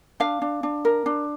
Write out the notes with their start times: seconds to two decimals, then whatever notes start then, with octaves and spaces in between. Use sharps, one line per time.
0.20 D4 F5
0.42 D4
0.63 D4
0.85 A#4
1.06 D4